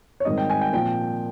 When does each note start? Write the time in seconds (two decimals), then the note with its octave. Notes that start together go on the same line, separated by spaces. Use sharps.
0.20 C#5
0.25 G#2 D#3 G3 C4 D#5
0.38 G5
0.50 G#5
0.61 G5
0.73 A#2 F3 C4 G5